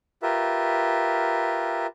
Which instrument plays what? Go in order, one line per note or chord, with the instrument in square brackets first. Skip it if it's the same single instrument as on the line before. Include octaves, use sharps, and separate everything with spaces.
[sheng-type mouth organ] F4 G4 A#4 B4 E5